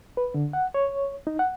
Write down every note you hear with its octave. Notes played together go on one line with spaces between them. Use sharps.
B4
D3
F#5
C#5
D#4
F#5